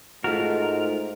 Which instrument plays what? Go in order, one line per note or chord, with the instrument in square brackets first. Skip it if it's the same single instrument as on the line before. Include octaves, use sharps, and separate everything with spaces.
[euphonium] G#2 [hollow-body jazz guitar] A3 F4 F#4 [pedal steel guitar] A#4